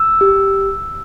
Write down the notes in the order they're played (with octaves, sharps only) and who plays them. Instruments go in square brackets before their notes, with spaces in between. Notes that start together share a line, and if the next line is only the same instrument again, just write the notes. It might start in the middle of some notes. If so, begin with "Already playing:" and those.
Already playing: [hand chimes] E6
G4